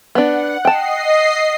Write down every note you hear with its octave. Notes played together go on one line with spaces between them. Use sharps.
B3 D4 F#5
D#5 G5 A5 C7